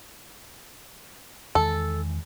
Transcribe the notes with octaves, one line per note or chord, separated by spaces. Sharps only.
E2 D#3 G#3 A4